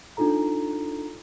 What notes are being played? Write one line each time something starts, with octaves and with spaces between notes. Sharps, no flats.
D4 D#4 F4 A4 A#5